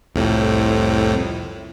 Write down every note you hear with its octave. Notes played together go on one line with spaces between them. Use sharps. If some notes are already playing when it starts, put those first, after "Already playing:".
C2 F2 A2